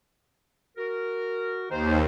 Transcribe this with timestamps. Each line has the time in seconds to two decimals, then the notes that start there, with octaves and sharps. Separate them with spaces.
0.77 F#4 A#4
1.71 D#2 D#3 D#4 C5